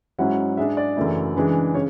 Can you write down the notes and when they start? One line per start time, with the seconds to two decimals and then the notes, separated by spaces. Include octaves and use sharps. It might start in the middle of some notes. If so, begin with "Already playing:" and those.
0.18 G#2 F#3 C#4 E4 F#5
0.57 G#2 G#3 D4 E5
0.77 D5
0.96 F#2 C#3 E3 A3 E4
1.36 C#3 E3 G#3 D4
1.74 C#3 C#5